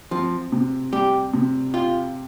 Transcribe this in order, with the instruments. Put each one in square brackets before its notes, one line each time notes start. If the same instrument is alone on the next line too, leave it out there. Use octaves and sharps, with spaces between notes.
[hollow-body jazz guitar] F3 [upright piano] C4
[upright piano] C3
[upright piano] G3 [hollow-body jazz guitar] G4
[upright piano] C3
[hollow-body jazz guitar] F4 [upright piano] G4